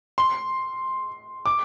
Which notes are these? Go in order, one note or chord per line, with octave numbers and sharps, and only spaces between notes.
C6
D6